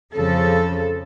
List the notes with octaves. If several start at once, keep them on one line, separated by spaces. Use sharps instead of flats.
F2 C#3 F3 A4